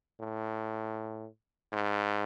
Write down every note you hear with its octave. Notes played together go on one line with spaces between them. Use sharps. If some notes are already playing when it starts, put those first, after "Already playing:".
A2
G#2